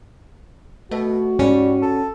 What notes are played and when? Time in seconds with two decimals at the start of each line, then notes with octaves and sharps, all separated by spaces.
0.91 B2 A3 F#4
1.39 G#2 G3 C#4
1.82 A4